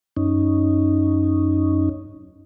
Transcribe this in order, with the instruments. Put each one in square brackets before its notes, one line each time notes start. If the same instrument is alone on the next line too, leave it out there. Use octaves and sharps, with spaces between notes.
[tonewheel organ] F#2 C#4 D#4